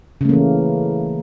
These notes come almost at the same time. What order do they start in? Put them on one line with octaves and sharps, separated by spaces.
C#3 A3 A#3 E3